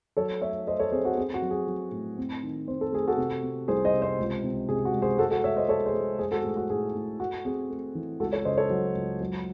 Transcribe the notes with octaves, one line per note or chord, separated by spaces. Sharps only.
F#3 A4 C#5
A3 C#5 E5
A3 C5 D#5
A4 C#5
C4 G#4 C5
F#4 A4
C4 G#4
F#4
F#3
G#4
F#3
A2
C4
D#3
C4 C5
A4
A3 G#4
F#4 A4
C3
C4
C2 G#4 C5
C5 D#5
C3
C5 D#5
C#2
C3
C3 G#4
F#4
G#3
G#4 C5
G#3 F#4 A4
F#4 A4
G#3 C#5 E5
C5 D#5
G#3 A4 C#5
G#4 C5
G#3
G#3 G#4 C5
F#4 A4
A2 G#4
F#4
A2 G#4
A2
A3 F#4
C4 G#4
A3
E3
C#2 F#4 A4
A4 C#5
C#3 C5 D#5
A4 C#5
F#3
C#2
F#3